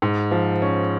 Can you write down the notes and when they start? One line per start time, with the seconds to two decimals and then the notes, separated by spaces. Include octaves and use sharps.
0.02 G#2
0.31 F3
0.62 C#4